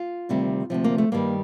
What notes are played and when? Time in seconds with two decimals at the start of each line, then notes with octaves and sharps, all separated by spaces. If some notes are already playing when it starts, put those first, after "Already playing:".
Already playing: F4
0.29 D2 C3 D#3 G3
0.70 D2 C3 F3
0.84 A#3
0.98 A3
1.12 G2 D#3 G3 A#3